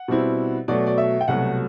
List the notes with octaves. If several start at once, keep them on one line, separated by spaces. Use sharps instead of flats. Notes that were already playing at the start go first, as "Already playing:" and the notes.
Already playing: F#5
B2 G3 C4 E4
B2 F#3 A3 D5
D5
E5
G5
C2 B2 F#3 A3 F#5